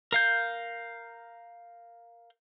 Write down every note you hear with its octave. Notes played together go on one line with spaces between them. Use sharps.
A#4 F5 G6